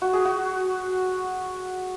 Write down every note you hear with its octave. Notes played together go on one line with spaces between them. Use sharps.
F#4
G#4
F#4